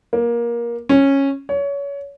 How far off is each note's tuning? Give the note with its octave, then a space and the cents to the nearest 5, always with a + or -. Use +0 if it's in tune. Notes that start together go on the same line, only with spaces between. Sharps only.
A#3 +20
C#4 -10
C#5 +25